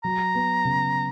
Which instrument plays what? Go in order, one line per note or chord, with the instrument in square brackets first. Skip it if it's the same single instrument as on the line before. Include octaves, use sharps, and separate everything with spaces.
[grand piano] F#3 [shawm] A#5
[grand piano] B3
C#3